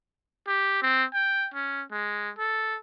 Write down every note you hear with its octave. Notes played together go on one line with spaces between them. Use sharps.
G4
C4
G5
C#4
G#3
A4